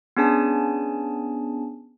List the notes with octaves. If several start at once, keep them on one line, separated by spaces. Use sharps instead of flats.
B3 C#4 D4 G#4 G#5 A5